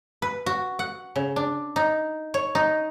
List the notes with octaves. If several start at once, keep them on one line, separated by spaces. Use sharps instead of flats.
B4
F#4
F#5
C#3
D4
D#4
C#5
D#4